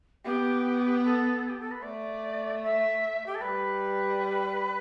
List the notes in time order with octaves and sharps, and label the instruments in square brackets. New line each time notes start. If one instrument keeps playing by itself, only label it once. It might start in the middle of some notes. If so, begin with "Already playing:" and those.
[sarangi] B3 [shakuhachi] G4
[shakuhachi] A4
G4
A4
B4
[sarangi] A3 [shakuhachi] D5
[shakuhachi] E5
G4
A4
[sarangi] G3 [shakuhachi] B4